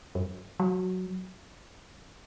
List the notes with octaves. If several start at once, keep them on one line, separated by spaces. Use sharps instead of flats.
F#2
F#3